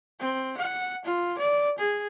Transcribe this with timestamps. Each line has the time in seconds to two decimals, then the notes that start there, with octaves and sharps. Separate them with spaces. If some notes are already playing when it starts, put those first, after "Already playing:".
0.20 C4
0.57 F#5
1.05 F4
1.39 D5
1.78 G#4